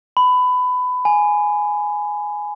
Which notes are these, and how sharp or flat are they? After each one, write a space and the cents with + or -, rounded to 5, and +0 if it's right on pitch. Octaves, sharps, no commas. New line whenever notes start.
B5 +20
G#5 +5